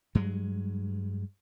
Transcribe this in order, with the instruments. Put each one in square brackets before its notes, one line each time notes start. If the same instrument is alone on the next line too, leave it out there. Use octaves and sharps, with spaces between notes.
[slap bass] G2 F#3 G#3